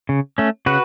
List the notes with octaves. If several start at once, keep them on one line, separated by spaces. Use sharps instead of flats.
C#3
A3 C#4
C#3 F#4 B4